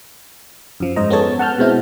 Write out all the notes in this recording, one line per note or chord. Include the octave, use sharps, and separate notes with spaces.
F#2 F3
G#2 C5 D#5 A#5
B3 C#4 G#4 A4 C#5 A5
F#5 A5 F6 G6
B2 G#3 C4 E4